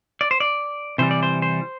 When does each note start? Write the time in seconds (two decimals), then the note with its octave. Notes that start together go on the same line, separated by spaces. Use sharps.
0.21 D5
0.31 C5
0.40 D5
0.98 C3 E3 G3 C5
1.11 D5
1.23 C5
1.42 C5